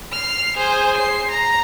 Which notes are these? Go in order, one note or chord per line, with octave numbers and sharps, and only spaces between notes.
F6 C7
G#4 C5
C7
A#5